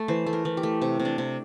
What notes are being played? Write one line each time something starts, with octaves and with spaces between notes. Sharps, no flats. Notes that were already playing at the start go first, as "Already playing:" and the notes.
Already playing: A3
E3 C5
A3
A#4
E3
G4
A3
C3
C3
D4
C3